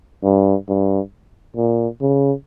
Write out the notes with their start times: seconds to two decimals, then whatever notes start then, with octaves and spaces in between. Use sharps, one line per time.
0.24 G2
0.69 G2
1.57 A#2
2.01 C#3